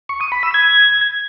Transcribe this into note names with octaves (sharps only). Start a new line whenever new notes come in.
C#6
D#6
B5
E6
G#6